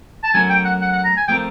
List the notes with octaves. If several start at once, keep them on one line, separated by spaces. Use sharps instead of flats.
A5
F#3 A3 C#4 F#4 A#4 G#5
G5
F#5
F#5
F#5
A#5
G#5
F3 A3 C4 F4 A#4 G5